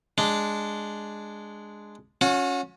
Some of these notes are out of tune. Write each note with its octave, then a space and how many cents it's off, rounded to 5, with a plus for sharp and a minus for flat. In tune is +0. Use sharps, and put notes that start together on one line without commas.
G#3 +0 D4 +0
C#4 +5 F#4 -35